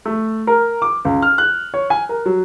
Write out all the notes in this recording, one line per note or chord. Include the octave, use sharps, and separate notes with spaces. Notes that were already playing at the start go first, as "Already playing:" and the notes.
A3
A#4
D6
C#2
F6
F#6
C#5
G#5
A#4
F#3